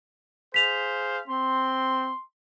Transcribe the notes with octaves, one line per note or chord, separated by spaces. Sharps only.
G#4 C5 F5 B6 F7
C4 C6